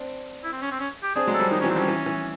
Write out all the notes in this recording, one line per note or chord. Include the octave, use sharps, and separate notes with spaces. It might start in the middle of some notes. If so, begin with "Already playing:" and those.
Already playing: C4 D4
E4
C4
C#4
C4
C#4
G4
C4 D4 G#4
F#3 G#3
A4
F3 G3
D#3 F3 D#4
C#4
E3 F#3
C4
F3 G3 C#4
E3
E3